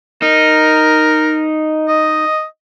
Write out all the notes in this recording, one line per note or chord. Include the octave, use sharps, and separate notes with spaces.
D#4 A#4
D#5